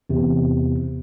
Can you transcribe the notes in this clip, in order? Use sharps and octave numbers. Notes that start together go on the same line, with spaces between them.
E2 C3